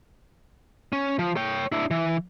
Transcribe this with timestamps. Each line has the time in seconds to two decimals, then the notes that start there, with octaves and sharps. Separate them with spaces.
0.93 C#4
1.19 F3
1.36 C#5 G5
1.72 D4 E4
1.91 E3